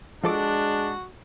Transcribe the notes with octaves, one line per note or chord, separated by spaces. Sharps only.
F3 G#3 D4 F#4 A4 D6